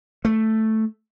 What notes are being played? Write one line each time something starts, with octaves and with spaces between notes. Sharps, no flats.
A3